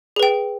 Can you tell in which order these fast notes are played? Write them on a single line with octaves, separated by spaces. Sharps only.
G#4 B4 G5